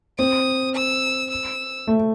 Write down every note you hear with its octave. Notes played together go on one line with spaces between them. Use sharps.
C4 D#6
E6
E6
A3